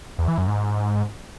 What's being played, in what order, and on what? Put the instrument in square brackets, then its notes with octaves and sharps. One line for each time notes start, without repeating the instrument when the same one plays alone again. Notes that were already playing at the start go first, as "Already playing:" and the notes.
[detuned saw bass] E2
E3
F#2
G#2